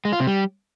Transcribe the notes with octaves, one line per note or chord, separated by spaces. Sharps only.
G#3
F4
C3
G3